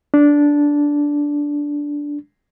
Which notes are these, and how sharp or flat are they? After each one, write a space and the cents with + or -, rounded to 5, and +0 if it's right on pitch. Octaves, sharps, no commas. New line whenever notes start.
D4 -10